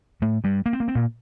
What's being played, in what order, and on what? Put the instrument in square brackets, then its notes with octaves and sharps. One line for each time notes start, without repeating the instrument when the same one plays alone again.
[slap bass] A2 A3
G2 G3
A#3
C4
A#3
C4
A#2 A#3